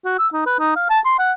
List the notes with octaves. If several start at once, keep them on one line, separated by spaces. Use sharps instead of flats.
F#4
E6
D#4
B4
D#4
F5
A5
C6
F#5